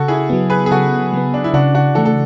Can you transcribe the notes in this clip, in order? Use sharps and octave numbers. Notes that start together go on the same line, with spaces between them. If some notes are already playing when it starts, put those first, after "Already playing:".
Already playing: C#3 F#4 A4
E4 G#4
F#3 B3
G#4 B4
G#4
C#3 F#4 A4
F#3 B3
D4
E4
C#3 D4 F#4
D4 F#4
E3 A3 F#4 A4
A4